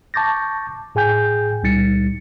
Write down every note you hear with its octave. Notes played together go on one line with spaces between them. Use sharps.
A5 C#6 D6 G6 A6 A#6
A2 G#4 G5 G#5 G6
C#2 A#2 G3 D#4 A6 C#7